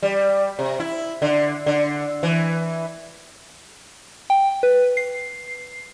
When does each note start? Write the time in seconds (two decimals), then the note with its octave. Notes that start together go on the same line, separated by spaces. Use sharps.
0.02 G3
0.59 C3
0.80 E4
1.22 D3
1.66 D3
2.23 E3
4.30 G5
4.63 B4
4.97 C7